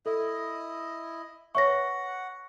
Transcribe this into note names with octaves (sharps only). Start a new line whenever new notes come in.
E4 A4 D#5
B4 C#5 E5 F#5 C#6 A#6